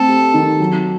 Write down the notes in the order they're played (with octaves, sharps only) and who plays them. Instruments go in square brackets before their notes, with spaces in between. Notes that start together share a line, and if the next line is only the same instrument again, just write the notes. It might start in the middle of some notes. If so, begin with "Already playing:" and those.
Already playing: [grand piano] A3 C4 [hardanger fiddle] A4
[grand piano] G4
D#3
F#3